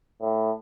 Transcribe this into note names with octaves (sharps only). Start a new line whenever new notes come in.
A2